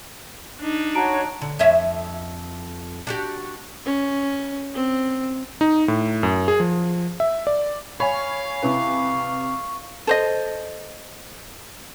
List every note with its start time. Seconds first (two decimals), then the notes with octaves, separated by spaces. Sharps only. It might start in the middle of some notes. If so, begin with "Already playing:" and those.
0.60 D4 D#4
0.95 F#4 C#5 A5 A#5 D7
1.42 D3
1.59 F2 C#5 E5
3.07 D4 F#4 G4
3.86 C#4
4.74 C4
5.61 D#4
5.88 A2
6.23 F#2
6.48 G#4
6.60 F3
7.20 E5
7.47 D5
8.00 C#5 F5 G#5 B5
8.63 C3 E4 B4 C#6
10.07 A4 C5 D#5